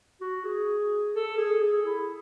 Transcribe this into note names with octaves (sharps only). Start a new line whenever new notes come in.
F#4
G#4
A4
G#4
G#4
E4